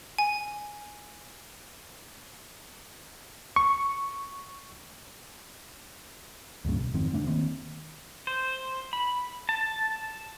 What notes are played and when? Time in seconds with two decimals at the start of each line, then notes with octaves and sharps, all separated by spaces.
0.18 G#5
3.56 C#6
6.65 D2 G2 A#2 C#3
6.78 B1
6.94 F2 G#2 D#3 C4
7.13 E1 D3 A3 D4
7.27 D#3 A#3 C4
8.27 C5
8.93 B5
9.49 A5